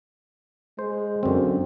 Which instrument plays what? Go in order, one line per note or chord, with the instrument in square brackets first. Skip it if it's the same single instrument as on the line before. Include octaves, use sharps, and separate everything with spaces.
[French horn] G#3 [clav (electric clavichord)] C5
[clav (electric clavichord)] F#2 C4 [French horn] D3